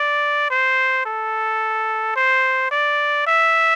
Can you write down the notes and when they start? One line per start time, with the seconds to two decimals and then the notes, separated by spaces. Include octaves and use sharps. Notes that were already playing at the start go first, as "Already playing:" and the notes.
Already playing: D5
0.50 C5
1.06 A4
2.16 C5
2.71 D5
3.27 E5